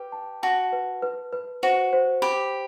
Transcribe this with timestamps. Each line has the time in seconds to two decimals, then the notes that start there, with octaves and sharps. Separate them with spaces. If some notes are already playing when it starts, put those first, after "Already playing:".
Already playing: G4 B4
0.12 A5
0.43 F#4 A5
0.72 B4
1.02 B4
1.33 B4
1.63 F#4 C5
1.93 C5
2.22 G4 B5